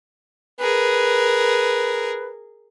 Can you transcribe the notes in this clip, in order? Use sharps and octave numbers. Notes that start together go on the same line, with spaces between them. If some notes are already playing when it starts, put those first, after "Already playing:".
G#4 A#4 B4